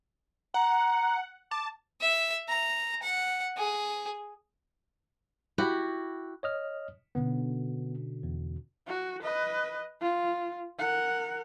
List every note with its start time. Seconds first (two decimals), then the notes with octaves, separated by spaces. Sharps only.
0.54 F#5 A#5
1.51 A5 D6
2.01 E5
2.49 A#5
3.02 F#5
3.57 G#4
5.58 E4 F#4 G4
6.43 C#5 D#5 F6
7.15 B2 D3 B3 C#4
8.23 E2
8.87 F#4
9.23 B4 D#5
10.01 F4
10.79 A#4 F#5